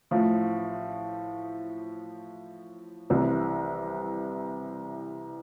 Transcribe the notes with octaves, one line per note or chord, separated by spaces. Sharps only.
A1 A2 F3
C2 C3 E3